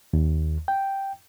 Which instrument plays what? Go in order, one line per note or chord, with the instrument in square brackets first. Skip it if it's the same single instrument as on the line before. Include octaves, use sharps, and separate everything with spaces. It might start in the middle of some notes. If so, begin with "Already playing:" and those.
[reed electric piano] D#2
G5